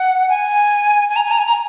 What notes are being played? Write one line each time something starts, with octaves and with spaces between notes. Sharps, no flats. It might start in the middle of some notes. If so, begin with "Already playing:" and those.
Already playing: F#5
G#5
G#5
A#5
G#5
A#5
G#5
A#5